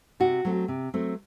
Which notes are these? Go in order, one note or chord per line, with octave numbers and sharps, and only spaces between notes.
C3 F#4
F#3 A3 C4
C3
F#3 A3 C4